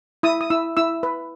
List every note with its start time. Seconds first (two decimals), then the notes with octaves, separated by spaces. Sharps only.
0.23 E4 D#6
0.41 D#6
0.50 E4 E6
0.77 E4 E6
1.03 B4